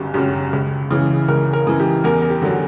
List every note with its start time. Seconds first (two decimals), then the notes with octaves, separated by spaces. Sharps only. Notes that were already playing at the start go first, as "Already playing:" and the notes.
Already playing: G1 F#2 C#3 G4
0.14 F#2 C#3 F#3 G4
0.53 C#2
0.91 C#3 E3
1.28 C#2 A#4
1.53 A#4
1.67 C#3 E3
1.80 G4
2.04 E2 A#4
2.22 A#4
2.30 G4
2.42 D3 F#3